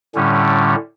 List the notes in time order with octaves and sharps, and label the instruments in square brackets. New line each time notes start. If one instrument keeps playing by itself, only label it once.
[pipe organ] A2 D3 G3 C#4